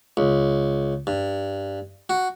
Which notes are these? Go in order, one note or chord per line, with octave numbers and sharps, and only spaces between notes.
C#2
G2
F#4